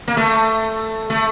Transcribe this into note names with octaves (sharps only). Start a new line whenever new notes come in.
A#3
A3
A3